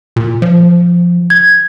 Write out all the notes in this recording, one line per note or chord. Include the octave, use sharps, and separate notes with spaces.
A#2
F3
G#6